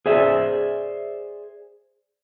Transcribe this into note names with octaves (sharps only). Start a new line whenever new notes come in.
G#4 C5 D5 E5